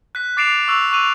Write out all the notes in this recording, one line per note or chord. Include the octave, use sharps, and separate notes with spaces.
F#6 B6
D6 A6 C7 D7 E7 F7
C#6 E6 F#6 F7
C#6 E6 F#6 D#7 F7